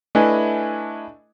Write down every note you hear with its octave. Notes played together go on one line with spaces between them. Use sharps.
A3 D4 E4 B4 D#5 G#5